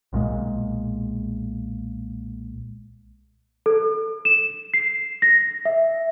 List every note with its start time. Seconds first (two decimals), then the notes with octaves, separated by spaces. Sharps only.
0.13 B1 A#2 C#3 G#3
3.66 A4
4.25 E7
4.74 C7
5.22 A#6
5.65 E5